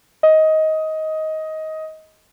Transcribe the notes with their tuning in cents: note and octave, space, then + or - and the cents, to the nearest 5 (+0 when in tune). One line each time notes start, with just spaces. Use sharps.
D#5 +15